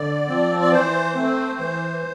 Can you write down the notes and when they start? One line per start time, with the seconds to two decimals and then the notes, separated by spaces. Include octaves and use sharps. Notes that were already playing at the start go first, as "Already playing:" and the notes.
Already playing: D3 D5
0.28 F3 C4
0.61 D5
0.71 E3 C5
1.15 A3 C4
1.59 E3